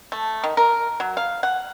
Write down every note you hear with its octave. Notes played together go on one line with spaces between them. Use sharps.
A3
D#3
A#4
F#3
F5
F#5